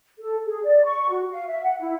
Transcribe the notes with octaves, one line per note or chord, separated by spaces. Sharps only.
A4
G#4
D5
C#6
F#4
F5
E5
F#5
E4